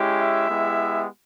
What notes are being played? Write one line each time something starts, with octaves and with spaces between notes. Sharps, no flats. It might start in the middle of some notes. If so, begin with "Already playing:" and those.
Already playing: G#3 C#4 E4 G4
E5
G#3 B3 E4 G4